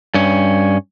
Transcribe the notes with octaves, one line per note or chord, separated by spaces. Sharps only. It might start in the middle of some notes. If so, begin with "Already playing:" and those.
G2 C#4